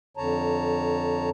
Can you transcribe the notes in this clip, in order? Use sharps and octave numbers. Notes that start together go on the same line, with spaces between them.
F2 D3 C#5 A5 A#5